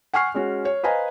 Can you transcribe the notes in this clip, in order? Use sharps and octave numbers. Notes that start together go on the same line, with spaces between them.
F#5 G#5 C#6 F6 C7
G#3 C#4 F#4
C#5
B4 C5 D#5 F5 G#5 A#5